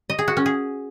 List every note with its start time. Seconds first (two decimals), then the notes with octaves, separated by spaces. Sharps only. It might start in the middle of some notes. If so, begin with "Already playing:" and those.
0.10 D#5
0.19 G#4
0.28 F#4
0.37 C#4
0.46 G#4